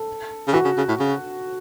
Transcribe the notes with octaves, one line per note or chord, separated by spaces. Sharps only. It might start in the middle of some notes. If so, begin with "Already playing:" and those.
Already playing: A4
C#3
E3 F#4
C#3
C#3
A2
C#3